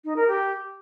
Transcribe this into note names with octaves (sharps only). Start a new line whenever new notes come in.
D#4
A#4
G4